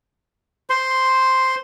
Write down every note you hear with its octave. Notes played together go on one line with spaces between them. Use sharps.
C5 C6